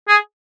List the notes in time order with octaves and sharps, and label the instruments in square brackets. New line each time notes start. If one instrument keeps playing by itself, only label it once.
[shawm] G#4